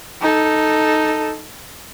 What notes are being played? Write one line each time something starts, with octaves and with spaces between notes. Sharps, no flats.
D#4 A4